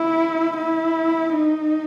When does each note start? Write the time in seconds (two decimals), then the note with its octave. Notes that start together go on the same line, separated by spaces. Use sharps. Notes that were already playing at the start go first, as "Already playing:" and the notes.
Already playing: E4
0.58 E4
1.33 D#4